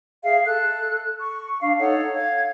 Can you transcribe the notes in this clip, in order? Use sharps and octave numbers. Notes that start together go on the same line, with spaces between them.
G#4 E5 F5
A4 F#6
C#6
D4 F5
D#4 A4 C#5 F#5
F5 G#6